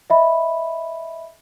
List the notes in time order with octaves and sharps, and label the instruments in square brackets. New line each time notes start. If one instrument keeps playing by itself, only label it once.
[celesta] D#5 E5 B5